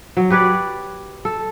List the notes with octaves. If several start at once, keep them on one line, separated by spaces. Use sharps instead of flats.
F#3
G4 B4 C#5 D5
A4